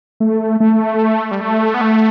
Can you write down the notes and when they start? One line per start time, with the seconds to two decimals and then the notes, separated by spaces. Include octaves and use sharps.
0.20 A3
0.60 A3
1.31 G3
1.41 A3
1.74 B3
1.81 A3